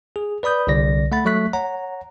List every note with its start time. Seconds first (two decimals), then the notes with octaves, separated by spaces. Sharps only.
0.16 G#4
0.43 B4 D5 B5 D#6 G6
0.67 C2 D3 D5 A#6
1.12 A3 F#5 B5 A6
1.25 F#3 A3 C#6 F#6 B6
1.53 C#5 F#5 A#5